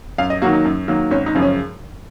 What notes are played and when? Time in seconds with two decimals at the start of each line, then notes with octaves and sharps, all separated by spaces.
0.18 F#2 F5
0.30 D#5
0.42 D#3 F#3 A#3 F#4
0.53 D#4
0.65 F#2
0.88 D#3 F#3 A#3
1.11 G#1 C#4
1.26 D#4
1.34 F#2 C#3 F3 G#3
1.42 C#4